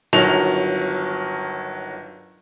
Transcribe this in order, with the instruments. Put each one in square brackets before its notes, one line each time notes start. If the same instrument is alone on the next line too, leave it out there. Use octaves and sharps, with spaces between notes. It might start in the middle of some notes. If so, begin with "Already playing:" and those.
[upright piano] G1 D#3 F#3 F7